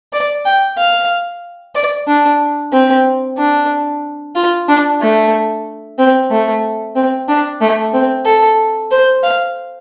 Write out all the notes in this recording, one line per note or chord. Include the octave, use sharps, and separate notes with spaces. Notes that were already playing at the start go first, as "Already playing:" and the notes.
D5
G5
F5
D5
D4
C4
D4
F4
D4
A3
C4
A3
C4
D4
A3
C4
A4
C5
F5